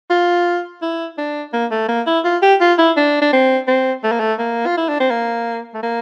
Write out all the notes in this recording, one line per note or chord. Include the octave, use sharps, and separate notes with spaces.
F4
E4
D4
A#3
A3
A#3
E4
F4
G4
F4
E4
D4
D4
C4
C4
A3
A#3
A3
A#3
F4
E4
D4
C4
A#3
A3
A#3